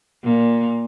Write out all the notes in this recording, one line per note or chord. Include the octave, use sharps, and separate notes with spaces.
A#2